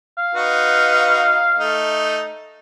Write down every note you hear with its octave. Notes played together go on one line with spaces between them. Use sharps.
F5
D#4 F#4 B4
A3 D#4